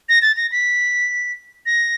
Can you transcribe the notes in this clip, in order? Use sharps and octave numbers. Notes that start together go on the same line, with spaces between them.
A#6
A6
A#6
B6
A#6